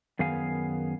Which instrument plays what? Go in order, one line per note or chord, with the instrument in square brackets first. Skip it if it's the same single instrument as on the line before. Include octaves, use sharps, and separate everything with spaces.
[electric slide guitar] F#2 D#3 B3 G#4 F5 G#5